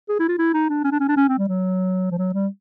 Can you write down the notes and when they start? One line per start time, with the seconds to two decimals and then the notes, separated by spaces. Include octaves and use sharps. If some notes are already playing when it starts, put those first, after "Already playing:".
0.09 G#4
0.19 E4
0.29 F4
0.38 E4
0.54 D#4
0.69 D4
0.84 C#4
0.91 D4
1.00 C#4
1.08 D4
1.16 C#4
1.28 C4
1.39 G3
1.48 F#3
2.11 F3
2.18 F#3
2.34 G3